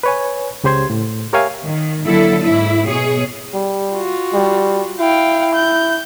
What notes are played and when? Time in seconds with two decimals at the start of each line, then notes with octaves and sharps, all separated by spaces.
0.03 B4 C#5 G#5
0.64 C#2 C#3 G4 C5 C6 G#6
0.90 A2
1.33 G4 A#4 C#5 E5 F5 G#5
1.64 D#3
2.05 D3 F#3 A#3 E4 A4
2.43 G#2 E4
2.88 B2 G#4 C#5
3.54 G3
3.92 F4 F#4
4.33 G3
5.00 E4 F5 G5
5.54 G6